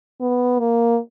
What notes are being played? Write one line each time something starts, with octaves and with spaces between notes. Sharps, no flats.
B3
A#3